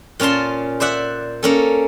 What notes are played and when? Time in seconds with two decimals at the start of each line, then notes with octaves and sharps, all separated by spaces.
0.20 A#2 C#4 F4 A5 C6
0.80 C5 D5 E5 F#5
1.43 A#3 C#4 A4